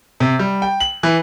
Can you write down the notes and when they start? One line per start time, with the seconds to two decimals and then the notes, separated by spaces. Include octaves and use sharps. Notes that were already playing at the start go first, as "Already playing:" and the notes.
0.20 C3
0.39 G3
0.62 G5
0.80 F#7
1.03 E3